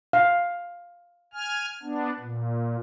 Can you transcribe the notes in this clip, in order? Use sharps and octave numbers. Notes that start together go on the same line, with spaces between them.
F5
G#5 F6
B3 D4
A#2